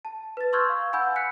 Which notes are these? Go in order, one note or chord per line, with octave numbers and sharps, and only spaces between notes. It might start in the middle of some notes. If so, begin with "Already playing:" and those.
A5
B4 A6
C6 C#6 E6 F6 G6 G#6
F5
F#5 G#5 B5 E6 G6
F#6 B6 C#7